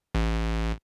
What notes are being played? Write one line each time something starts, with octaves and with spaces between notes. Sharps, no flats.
A1